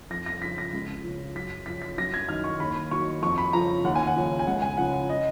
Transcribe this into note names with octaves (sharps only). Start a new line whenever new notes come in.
F2 A#6
A#6
C#3 F3 B6
A#6
C#2
C#3 F3
F#2 B6
C#3 F3 B6
B6
F#2 A#6
G#6
D#3 F#3 F6
C#6
D#2 B5
D#3 F#3 C#6
F2 C#6
B5
C#3 F3 A#5
D#2 F#5
G#5
F#5
C#3 F3
G#5
C#2 F#5
G#5
C#3 F3 F#5
F#5
D#5